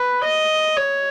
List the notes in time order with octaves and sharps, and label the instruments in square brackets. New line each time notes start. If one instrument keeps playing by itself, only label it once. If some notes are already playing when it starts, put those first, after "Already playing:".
Already playing: [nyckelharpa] B4
D#5
C#5